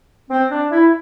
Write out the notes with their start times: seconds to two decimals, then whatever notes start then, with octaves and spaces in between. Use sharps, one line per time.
0.29 C4
0.49 D4
0.71 E4